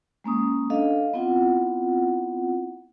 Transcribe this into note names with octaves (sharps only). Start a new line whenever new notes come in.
G#3 A#3 C#4 D#6
D4 A4 D#5 F5
B3 C4 E4 F4 F#5